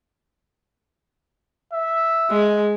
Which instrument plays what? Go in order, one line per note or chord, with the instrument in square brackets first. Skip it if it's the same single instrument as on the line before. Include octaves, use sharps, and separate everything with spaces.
[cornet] E5
[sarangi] G#3